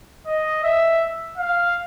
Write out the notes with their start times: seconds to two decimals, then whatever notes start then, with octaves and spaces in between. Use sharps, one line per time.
0.27 D#5
0.64 E5
1.38 F5